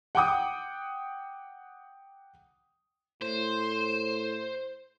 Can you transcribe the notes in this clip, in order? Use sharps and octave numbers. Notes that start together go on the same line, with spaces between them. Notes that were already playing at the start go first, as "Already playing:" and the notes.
F#5 G5 D6 D#6
A2 C5